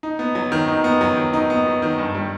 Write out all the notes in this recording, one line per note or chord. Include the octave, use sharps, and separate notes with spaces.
D#4
B3
F#3
D#3
D#4
B3
F#3
D#3
D#4
B3
F#3
D#3
G2
G3